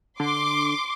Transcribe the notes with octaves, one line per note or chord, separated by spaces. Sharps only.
D3 C6 D6